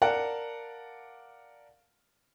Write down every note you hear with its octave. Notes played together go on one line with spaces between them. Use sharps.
A#4 D5 F5 F#5 A5